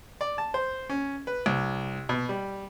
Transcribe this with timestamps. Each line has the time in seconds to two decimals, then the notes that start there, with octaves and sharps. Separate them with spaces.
0.21 D5
0.38 A5
0.54 C5
0.90 C#4
1.27 B4
1.46 C2
2.09 B2
2.29 G3